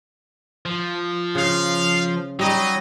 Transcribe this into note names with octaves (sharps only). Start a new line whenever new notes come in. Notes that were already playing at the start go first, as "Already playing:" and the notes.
F3
C#3 F5
F#3 G3 D#4 D#5